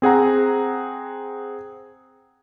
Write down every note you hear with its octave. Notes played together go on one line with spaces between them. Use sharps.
C4 G#4 F#5 A#5